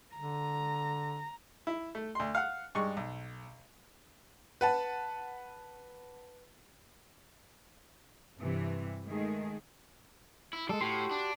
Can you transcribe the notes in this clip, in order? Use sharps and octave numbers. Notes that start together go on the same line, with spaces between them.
D3 A#5
E4
A3
D2 C6
F5 F#5
G2 G#3 C#6
B1
B4 F#5 A5
G2 C3 E3
D#3 G#3 A3 G#4
E4
G3 G#3 A4
A2 F#4 G4 C6
D4